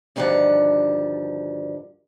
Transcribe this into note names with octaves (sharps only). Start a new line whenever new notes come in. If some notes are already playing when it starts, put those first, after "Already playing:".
D2 G2 D#3 F3 D5 F#5